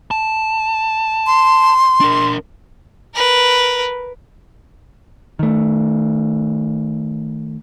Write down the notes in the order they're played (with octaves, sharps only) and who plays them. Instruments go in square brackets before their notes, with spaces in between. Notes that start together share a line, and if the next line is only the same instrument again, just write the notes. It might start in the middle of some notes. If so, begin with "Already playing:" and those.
[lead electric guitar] A5
[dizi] C6
[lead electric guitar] D4 A#4
[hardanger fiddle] A#4 B4
[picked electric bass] D#3 A3